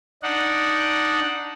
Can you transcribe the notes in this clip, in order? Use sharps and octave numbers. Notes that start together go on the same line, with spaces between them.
D4 D#4 F#5